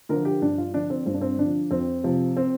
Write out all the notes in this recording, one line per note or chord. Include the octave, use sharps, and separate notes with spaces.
D3 F3 A#4
G4
G2 D4
F4
D3 F3 D4
C4
G2 C4
D4
C4
D3 F3 D4
F2 C4
C3 F3
C4